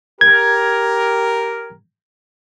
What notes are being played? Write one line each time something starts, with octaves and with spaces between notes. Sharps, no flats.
G4 A#4 G#6